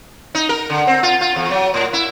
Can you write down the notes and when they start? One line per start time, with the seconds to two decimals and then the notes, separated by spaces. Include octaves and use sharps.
0.35 D#4
0.49 A#4
0.70 D3
0.87 C4
1.03 F4
1.21 F4
1.36 E2
1.51 F#3
1.74 A2
1.93 E4